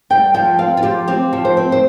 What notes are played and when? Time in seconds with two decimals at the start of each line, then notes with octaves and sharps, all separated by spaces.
0.10 G3 G5
0.34 F3 G5
0.58 C4 F5
0.77 F4
0.83 F3 G4
1.08 C4 G4
1.33 F3
1.45 C5
1.57 C4
1.72 C5